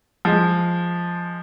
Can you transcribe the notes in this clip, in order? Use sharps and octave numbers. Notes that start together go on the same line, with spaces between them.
F3 G#3